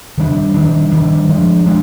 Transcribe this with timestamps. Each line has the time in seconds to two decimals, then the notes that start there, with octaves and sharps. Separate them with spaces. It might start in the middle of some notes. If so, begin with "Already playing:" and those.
0.18 D#3 G3 D4
0.54 D#3 G3 D4
0.92 D#3 G3 D4
1.29 F3 G#3 D4
1.66 G#3 D4